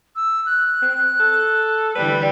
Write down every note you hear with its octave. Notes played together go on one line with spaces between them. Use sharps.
E6
F#6
C4
A4
D3 E3 G3 B4